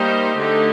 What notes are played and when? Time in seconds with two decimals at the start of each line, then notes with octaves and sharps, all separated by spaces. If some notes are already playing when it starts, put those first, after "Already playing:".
Already playing: G3 A#3 D#4 G4 C5
0.37 D3 A3 D#4 G4